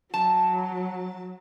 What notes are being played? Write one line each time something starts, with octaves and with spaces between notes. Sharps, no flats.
F#3 A5